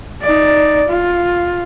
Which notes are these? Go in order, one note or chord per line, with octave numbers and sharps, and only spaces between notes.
D#4 D5
F4